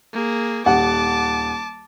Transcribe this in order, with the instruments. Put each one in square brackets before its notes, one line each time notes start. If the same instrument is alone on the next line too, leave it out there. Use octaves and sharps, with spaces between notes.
[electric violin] A#3 G#4
[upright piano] D#1 F#5 [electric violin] A5 D6